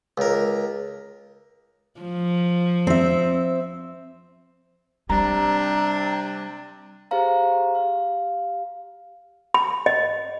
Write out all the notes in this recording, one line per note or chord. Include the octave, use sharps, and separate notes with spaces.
C#2 A#4
F3
C4 E5
C3 G3 D4 A#5
G4 G#4 C5 F5 A#5
G4 F5
B5
D#5